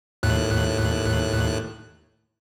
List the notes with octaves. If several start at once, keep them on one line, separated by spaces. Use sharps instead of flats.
D#2 A2 F#6